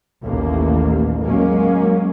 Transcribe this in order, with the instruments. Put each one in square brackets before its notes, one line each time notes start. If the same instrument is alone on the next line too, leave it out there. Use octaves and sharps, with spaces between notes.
[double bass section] A1 D#2 A2 A#3
F#3 G#3 A#3 C#4